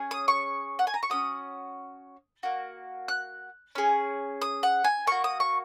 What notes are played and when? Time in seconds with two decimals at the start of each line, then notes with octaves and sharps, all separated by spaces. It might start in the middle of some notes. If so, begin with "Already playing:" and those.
Already playing: C#4 G#4
0.11 D#6
0.28 C#6
0.79 F#5
0.87 G#5
0.94 A#5
1.03 C#6
1.10 C#4 F#4 D#6
2.43 A#3 F#4
3.08 F#6
3.75 C#4 G#4
4.42 D#6
4.63 F#5
4.84 G#5
5.07 A#3 F#4 C#6
5.24 D#6
5.40 C#6